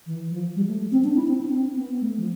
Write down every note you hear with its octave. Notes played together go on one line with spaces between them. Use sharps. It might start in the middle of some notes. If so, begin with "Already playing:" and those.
E3
F3
G3
A3
C4
D4
E4
C4
D4
C4
B3
A3
F3